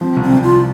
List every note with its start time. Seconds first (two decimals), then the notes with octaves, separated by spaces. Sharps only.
0.01 F3 C4
0.16 C2
0.23 C4
0.33 C2
0.43 F4